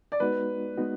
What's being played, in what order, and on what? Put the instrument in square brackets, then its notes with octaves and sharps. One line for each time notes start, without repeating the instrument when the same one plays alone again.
[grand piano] D5
[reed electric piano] G#3 B3 D#4 F#4 [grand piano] B4
[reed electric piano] G#3 B3 D#4 F#4